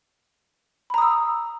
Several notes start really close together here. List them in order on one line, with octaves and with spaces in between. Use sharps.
B5 A#5 D#6 E6